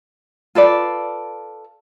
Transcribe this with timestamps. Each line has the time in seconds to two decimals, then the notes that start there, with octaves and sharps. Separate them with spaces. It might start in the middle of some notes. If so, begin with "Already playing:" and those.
0.55 F4 A4 B4 D5